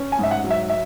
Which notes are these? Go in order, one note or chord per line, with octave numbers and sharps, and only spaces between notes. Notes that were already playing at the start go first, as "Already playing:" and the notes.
Already playing: C#4
G#5
G#2 E5
F#5
F#3
E5
E5